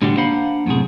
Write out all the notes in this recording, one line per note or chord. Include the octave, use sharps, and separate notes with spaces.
A2 D3 G3 D4 F#4 G4
A#3 D4 C5 F5 F#5 B5
F#2 A2 C3 G#4